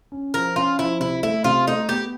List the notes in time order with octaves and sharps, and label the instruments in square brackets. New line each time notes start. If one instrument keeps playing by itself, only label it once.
[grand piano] C#4
[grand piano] F3 [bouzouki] A#4
[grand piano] C#4 [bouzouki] F4
[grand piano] F3 [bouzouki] E4
[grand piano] C3 [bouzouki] E4
[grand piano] A3 [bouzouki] E4
[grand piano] C3 [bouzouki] F4
[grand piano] A3 [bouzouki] D#4
[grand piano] B3 [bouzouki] G4